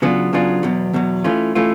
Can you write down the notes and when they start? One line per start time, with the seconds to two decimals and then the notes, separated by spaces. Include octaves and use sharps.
0.02 C#3 F#3 B3 D4 F4
0.33 C#3 F#3 B3 D4 F4
0.63 E2 B2 F#3
0.94 E2 B2 F#3
1.24 E3 A3 C#4 F4
1.55 E3 A3 C#4 F4